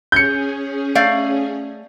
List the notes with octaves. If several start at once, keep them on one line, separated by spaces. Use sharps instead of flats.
C#4 G#4 G6 C#7
A3 D5 F5